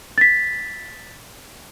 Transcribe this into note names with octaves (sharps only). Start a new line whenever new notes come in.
A6 B6